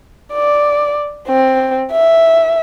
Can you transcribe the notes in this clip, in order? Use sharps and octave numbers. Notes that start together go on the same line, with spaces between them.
D5
C4
E5